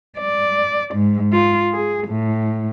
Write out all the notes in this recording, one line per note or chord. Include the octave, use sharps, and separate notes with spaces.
D5
G#2
F4
G#4
A2